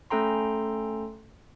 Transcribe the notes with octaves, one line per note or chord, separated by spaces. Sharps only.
A3 C#4 A4 G5 A#5 C6